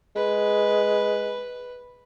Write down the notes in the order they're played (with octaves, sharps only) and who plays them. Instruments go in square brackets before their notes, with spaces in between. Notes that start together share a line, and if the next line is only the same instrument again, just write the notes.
[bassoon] G#3 [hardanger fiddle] B4